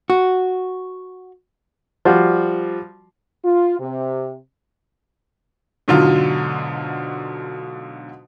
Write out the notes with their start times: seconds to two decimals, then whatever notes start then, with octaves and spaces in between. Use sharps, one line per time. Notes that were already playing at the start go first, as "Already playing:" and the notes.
0.10 F#4
2.05 F3 G3 F#4 D5 F5
3.44 F4
3.79 C3
5.88 G#2 B2 D3 F#3 F4